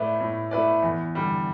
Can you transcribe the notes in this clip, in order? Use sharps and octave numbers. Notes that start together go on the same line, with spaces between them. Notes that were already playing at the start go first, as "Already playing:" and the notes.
Already playing: A2 A3 E4 B4 D5
A2
A3 E4 B4 D5
E2
D3 G3